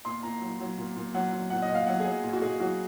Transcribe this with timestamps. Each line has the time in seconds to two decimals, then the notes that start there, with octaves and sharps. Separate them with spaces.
0.05 A#2 C6
0.23 A#2 A#5
0.41 F#3
0.60 F#3
0.77 A#2
0.96 A#2
1.14 F#3 F#5
1.32 F#3
1.50 A#2 F#5
1.62 D#5
1.69 A#2
1.74 F5
1.87 F#3 F#5
2.00 F#3 G#4
2.23 A#2
2.33 F#4
2.42 A#2 G#4
2.60 F#3 F#4